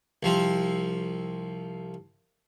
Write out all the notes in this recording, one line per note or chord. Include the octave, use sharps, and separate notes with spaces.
C2 F3 C4